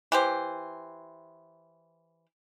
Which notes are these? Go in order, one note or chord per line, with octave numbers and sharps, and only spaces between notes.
E3 G4 C5